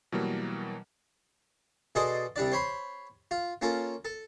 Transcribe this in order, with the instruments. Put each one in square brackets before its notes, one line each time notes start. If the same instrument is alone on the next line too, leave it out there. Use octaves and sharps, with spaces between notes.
[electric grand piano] B2 E3 F#3 G3 A#3
[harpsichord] B2 G#4 A4 D5 D#5 C6
C2 G3 D4 D5
C5 C#5 B5 C6
F4
A#3 C#4 F4 A4
A4